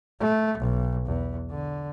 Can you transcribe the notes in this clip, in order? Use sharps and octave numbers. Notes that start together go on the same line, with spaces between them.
A3
B1
E2
D3